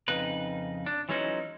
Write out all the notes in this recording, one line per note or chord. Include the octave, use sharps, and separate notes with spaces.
F2 C#3 D#4 B4
D4
E3 F#3 G#3 C#4 D#4 E4